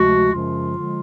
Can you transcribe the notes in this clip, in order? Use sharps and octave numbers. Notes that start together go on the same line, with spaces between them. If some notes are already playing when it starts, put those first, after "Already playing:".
Already playing: D2 C3 F3 G#3 F#4
F#2 C#3 F3 G#3 F4
D3 F3 G#3